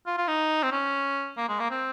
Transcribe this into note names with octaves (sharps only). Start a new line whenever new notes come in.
F4
F4
D#4
C4
C#4
A#3
G#3
A#3
C4